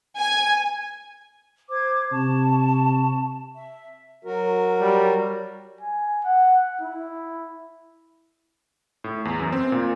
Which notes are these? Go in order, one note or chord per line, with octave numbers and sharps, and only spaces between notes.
G#5
C5 D6 G#6
C3 A5 C#6
E5
F#3 F#4 A#4
G3
G#5
F#5
E4
A2
E2
F#2
C4
A#2